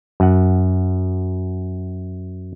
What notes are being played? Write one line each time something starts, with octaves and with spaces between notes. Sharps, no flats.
F#2 F#5